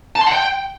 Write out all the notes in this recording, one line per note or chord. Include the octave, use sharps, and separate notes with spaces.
A5
C6
F#5
G5